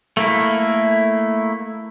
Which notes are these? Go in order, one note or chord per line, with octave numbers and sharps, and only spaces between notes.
A3 A#3 E4